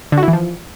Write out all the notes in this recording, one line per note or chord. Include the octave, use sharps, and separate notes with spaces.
D3
F#4
E4
E3
F3